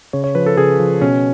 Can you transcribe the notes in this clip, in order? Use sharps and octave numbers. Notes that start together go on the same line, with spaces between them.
C#3 C#5
C#5
F3 B4
A4
C#3 G#4
F3
B2 C#4